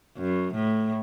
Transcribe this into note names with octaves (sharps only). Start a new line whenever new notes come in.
F#2
A2